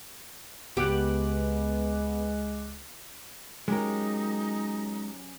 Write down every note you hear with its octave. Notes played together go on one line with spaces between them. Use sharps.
C#2 G#3 B3 G4 D6 F#6
F#3 G#3 C#4 D#4 G4 A#4